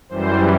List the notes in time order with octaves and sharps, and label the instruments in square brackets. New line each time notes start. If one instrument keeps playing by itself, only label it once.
[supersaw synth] F#2 E3 G3 C5